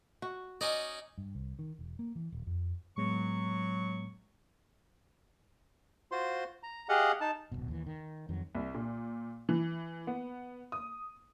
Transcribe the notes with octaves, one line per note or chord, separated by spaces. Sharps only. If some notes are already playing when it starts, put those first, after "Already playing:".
F#4
C#4 D#4 D5 D#5
G2
C2
D#3
E1
A#3
E3
D#1
F2
A2 F#3 G#3 B3 C#6
F4 F#4 C5 C6
A#5
G4 G#4 D#5 F5 F#5
D#4 A5
D1 G1 B2
D#2 E3
D#3
F2 D#3 F#3
C2
A#2
E3
B3
D#6